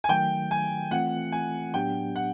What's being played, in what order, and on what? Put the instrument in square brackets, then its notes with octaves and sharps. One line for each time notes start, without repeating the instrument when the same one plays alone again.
[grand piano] G#5
[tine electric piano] D#3 F#3 A3 [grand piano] G5
[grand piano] G#5
[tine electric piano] E3 A3 C4 F4 [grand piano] F#5
[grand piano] G#5
[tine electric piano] A2 F#3 B3 D4 G4 [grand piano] G5
[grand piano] F#5